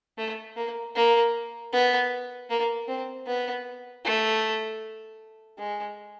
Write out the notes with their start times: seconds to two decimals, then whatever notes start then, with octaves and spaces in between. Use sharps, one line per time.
0.18 A3
0.56 A#3
0.96 A#3
1.73 B3
2.50 A#3
2.88 C4
3.27 B3
4.05 A3
5.59 G#3